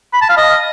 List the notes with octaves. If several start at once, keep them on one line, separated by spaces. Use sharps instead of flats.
B5
A5
F5
D#5